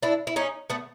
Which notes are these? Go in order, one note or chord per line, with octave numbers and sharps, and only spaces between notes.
D4 E4
E4
C#4 D#4
A3 B3